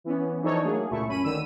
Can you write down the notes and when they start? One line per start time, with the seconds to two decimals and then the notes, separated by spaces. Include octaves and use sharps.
0.04 E3 B3 C#4
0.42 E3 F3 D4 D#4 A4 C#5
0.64 F#3 A3 A#3 G#4
0.90 C#2 A#2 A3 E4 C#6
1.07 F#2 C#4 B5 D#7
1.24 G#1 D2 D3 D#3 E6 D#7